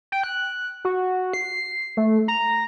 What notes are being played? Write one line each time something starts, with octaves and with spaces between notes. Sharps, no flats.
G5
F#6
F#4
C7
A3
A#5